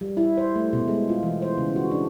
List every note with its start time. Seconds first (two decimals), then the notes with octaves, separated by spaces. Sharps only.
0.01 G3
0.17 E4
0.37 C5
0.56 A3
0.73 B2
0.88 G#3
1.09 F4
1.23 E3
1.42 C5
1.58 C#3
1.76 F#4
1.91 D4